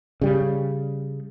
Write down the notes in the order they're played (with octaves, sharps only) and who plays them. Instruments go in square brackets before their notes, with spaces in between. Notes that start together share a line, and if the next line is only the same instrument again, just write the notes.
[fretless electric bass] C#3 G3